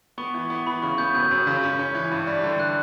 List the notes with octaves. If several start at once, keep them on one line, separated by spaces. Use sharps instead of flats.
B3 C#6
E3
B3
E3 B5
C#3 C#6
B3 G6
F#2 G6
F#2
C#3
C#4
C#4
E3
G2
G3
D3
F#6